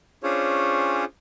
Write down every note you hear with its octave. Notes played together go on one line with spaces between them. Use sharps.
C#4 D4 F4 G#4 C5 C#5